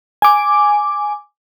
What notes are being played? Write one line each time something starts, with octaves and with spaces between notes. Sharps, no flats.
G#5 D6